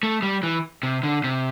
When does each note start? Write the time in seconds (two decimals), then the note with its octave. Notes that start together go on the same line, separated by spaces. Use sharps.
0.03 A3
0.23 G3
0.43 E3
0.83 C3
1.03 D3
1.24 C3